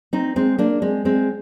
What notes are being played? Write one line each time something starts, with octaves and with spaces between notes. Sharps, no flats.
C4 D#4
G#3 C4
A#3 D4
G#3 C4
G#3 C4